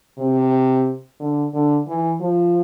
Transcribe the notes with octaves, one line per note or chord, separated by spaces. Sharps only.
C3
D3
D3
E3
F3